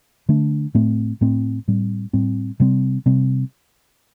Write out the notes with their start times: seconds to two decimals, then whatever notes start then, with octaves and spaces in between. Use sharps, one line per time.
0.29 D3 A3 D4
0.75 A2 A3 C4
1.21 A2 A3 C4
1.68 A2 G3 C4
2.13 A2 G3 C4
2.60 C3 G3 C4
3.06 C3 G3 C4